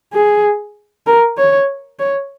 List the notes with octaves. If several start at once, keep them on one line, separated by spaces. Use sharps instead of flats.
G#4
A#4
C#5
C#5